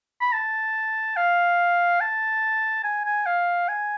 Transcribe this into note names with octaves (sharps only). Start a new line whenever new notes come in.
B5
A5
F5
A5
G#5
G#5
F5
G#5